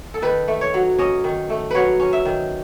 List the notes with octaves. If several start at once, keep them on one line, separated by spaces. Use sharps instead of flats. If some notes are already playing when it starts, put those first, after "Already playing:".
A4
D#3 B4
A3
C#5
F#3
C#4 D#5
D#3
A3
F#3 B4 C#5
C#4
E5
D#3